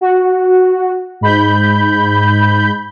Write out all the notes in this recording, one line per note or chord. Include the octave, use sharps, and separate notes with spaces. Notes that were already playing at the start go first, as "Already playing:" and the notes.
F#4
G#2 B5 G6